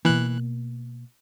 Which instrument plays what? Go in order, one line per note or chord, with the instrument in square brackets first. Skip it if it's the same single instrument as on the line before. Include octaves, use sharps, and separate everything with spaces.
[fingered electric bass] B2 A#3 [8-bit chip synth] E3 F#6